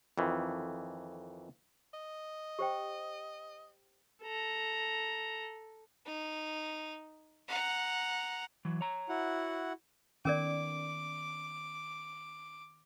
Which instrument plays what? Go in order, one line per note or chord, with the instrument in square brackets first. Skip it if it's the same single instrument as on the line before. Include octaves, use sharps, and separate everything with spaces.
[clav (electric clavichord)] F2 D#3 E3
[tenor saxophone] D#5
[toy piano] G4 C5 G5
[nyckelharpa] A4 A#5
[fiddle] D#4
F#5 A#5
[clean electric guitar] E3 F#3
C#5 A#5
[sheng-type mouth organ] E4 F#4 F#5
[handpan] D#3 B3 [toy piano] C#4 A#4 D5 [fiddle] D6